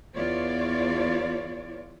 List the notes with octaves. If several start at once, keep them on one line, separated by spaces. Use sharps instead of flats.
E2 B3 F4 C#5 D5